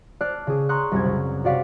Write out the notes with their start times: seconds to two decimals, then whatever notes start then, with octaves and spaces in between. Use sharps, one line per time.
0.21 D5 A5 F6 F#6 C7
0.47 C#3 G#4
0.69 A#5 C6 C#6 D#6 F#6
0.92 C2 F#2 G#6
1.05 C#3
1.44 C3 F#4 D5 F5 F#5 B6